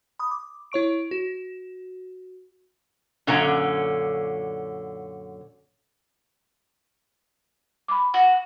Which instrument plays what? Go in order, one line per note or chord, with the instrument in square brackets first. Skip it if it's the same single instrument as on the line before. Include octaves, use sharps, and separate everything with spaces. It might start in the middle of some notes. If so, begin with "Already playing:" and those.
[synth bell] B5 D#6
D6
E4 C#5 C#6 D7
F#4
[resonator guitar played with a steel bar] F#2 A#2 D3 C#4 A#5
[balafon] B5 D6
[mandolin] F#4